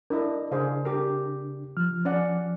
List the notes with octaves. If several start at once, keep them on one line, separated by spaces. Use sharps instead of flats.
D4 E4 A#4 D#5
C#3 D4 G#4 C5 F5
G4 A#4
F3 F6
C#4 D5 F#5